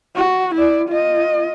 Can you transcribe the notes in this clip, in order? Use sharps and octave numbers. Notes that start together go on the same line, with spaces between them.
F#4
E4 D5
F4 D#5